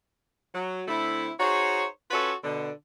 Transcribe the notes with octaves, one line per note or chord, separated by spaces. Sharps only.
F#3
D3 A3 C4 E4
D#4 F#4 G#4 C5 C#5
C#4 F4 F#4 A4 B4 C#5
B2 D3